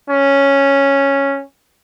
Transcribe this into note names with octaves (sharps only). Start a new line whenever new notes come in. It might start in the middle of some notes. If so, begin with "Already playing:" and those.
C#4